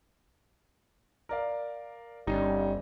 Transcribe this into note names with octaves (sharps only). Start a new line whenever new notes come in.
A#4 D5 F5
G1 G3 C#4 D#4